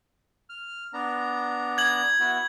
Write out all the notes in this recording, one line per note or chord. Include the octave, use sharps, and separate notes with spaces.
F6
B3 D4 A#5
G#6 F#7
B3 E4 F#4